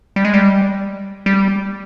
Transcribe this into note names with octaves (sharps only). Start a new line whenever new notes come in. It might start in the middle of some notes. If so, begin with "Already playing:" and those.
G3
G#3
G3
G3